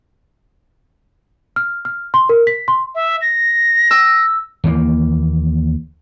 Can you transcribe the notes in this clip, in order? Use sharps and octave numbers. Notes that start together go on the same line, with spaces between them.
F6
F6
C6
A#4
B6
C6
E5
A#6
E6
D#2 E3 A#3